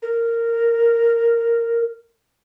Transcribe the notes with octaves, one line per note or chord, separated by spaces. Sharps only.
A#4